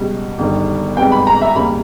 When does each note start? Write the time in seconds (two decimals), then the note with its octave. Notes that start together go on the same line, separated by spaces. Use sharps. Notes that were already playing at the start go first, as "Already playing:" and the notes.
Already playing: C#2 B2 G3
0.38 G1 G2 D#3 G3
0.97 G#1 G#2 G3 B3 G5
1.12 B5
1.27 A#5
1.42 E5
1.56 D#2 C#3 G3 A#3 B5